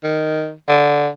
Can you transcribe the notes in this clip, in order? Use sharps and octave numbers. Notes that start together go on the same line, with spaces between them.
D#3
D3